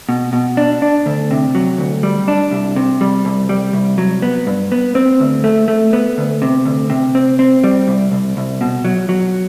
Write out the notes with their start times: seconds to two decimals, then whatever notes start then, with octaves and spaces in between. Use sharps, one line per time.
0.09 B2
0.33 B2
0.57 D4
0.82 D4
1.06 D2
1.31 C3
1.55 F#3
1.78 D2
2.03 G3
2.28 D4
2.51 C2
2.76 C3
3.01 G3
3.25 C2
3.49 G3
3.73 C2
3.98 F#3
4.22 B3
4.47 G2
4.72 B3
4.95 C4
5.20 D2
5.44 A3
5.68 A3
5.93 B3
6.18 D2
6.42 C3
6.65 D2
6.90 C3
7.15 C4
7.39 C4
7.64 G3
7.88 C2
8.12 C2
8.37 C2
8.61 B2
8.85 F#3
9.09 F#3